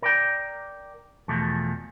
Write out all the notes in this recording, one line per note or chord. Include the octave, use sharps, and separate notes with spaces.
A#4 D5 G5
E2 B2 F3 A3